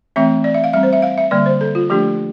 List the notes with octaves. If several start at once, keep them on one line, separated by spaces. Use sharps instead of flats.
E3 A3 C4 E5
D5
E5
F5
G3 C4 E5
C5
E5
F5
E5
D3 G3 A#3 D5
C5
A4
F4
F3 A3 D4 G4